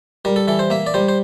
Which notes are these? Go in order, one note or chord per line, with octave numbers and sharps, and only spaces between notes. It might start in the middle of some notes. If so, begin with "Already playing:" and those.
G3 A#4
A4
E3 A4
C5
A#3 E5
D5
G3 C5
C5